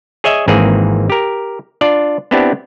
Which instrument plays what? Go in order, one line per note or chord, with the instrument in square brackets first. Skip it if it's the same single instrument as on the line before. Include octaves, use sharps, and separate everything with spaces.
[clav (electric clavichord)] G#4 C#5 D#5 E5 G#5
G#1 G#2 E3 A#3 C4 G#4
G4 A#4
D4 F4 D5
B3 C4 D4 E4 G4